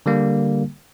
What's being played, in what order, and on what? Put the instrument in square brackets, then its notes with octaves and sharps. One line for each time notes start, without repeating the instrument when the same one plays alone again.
[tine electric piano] D3 G3 A#3